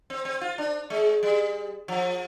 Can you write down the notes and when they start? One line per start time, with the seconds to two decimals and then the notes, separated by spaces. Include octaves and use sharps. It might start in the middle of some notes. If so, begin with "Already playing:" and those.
0.10 C4
0.25 C4
0.41 F4
0.58 D4
0.90 G#3
1.23 G3
1.88 F3